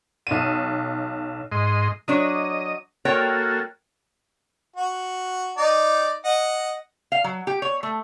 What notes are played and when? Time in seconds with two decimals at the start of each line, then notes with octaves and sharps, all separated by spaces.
0.27 B1 D#7
1.52 G#2 D#5 C6
2.08 F#3 D4 C#5 D#5
3.05 A#3 F#4 A4 A#4 C#5 G5
4.77 F#4
5.58 D#4 D5
6.25 D#5 F#5
7.12 F5
7.24 F#3
7.47 G4
7.62 C#5
7.83 A3